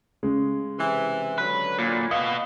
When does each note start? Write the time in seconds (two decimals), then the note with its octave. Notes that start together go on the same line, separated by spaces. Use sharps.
0.23 C#3 G#3
0.78 C3 E3
1.38 D3 F#3 B4
1.79 A#2
2.11 B3 D#5 F5